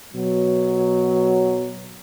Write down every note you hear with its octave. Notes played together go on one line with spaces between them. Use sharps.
B2 F#3